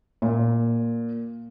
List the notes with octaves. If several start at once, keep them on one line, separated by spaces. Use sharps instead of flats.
A#2